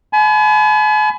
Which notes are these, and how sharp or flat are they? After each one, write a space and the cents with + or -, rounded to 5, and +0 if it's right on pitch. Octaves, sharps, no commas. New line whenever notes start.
G#5 +40 B5 +20